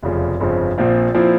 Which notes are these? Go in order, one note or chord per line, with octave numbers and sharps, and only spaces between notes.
F1 E2 C#3 F3
G1 F2 C#3 F3 C4
A#1 A#2 F3 C4 F4
A#2 F3 C4 E4